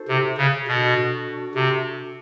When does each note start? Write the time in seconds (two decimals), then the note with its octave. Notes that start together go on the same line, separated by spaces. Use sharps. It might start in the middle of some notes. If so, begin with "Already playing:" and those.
Already playing: D#4 F#4 A4 C5
0.08 C3
0.37 C#3
0.67 B2 D4 F#4 A4
1.55 C3